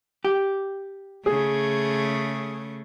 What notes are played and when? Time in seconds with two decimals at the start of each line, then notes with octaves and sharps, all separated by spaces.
0.25 G4
1.26 C#3 A3 G#4